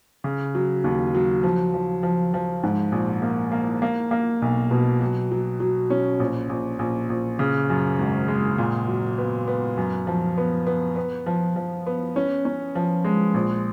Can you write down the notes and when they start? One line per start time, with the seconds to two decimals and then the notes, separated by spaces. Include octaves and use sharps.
0.24 C#3
0.55 F#3
0.84 D#2
1.15 F#3
1.43 F3
1.74 F3
2.03 F3
2.34 F3
2.64 G#2
2.92 A#1
3.22 A#3
3.52 A#3
3.82 A#3
4.11 A#3
4.42 B1
4.71 B2
5.01 F#3
5.31 F#3
5.60 F#3
5.90 C#4
6.20 A#1
6.49 A#1
6.79 A#1
7.10 A#1
7.39 C#3
7.70 F#2
7.99 G#1
8.28 G#3
8.58 A#2
8.88 F#3
9.18 B3
9.48 B3
9.77 F#2
10.07 F3
10.38 B3
10.67 B3
10.96 B3
11.26 F3
11.56 F3
11.87 B3
12.16 C#4
12.45 C#4
12.75 F3
13.05 G#3
13.34 A#1